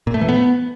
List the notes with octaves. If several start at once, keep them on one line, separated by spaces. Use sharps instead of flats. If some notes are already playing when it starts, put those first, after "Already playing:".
A#2
A3
E3
B3